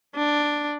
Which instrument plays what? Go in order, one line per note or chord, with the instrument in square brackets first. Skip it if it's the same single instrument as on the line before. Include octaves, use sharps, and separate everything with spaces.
[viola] D4